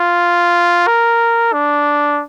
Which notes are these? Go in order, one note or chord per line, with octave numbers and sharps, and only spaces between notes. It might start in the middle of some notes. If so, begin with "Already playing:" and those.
Already playing: F4
A#4
D4